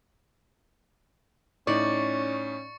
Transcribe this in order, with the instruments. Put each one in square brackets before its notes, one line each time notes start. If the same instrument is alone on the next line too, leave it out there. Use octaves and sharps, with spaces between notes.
[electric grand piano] A2 D#4 [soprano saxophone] C#4 [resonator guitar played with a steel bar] D5 [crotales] C#6 A6 C#7